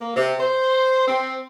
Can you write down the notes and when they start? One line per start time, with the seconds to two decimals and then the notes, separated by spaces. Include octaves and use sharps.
0.01 A#3
0.16 C3
0.40 C5
1.07 C4